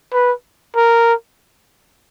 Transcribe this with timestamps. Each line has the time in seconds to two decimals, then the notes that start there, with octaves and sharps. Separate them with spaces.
0.13 B4
0.76 A#4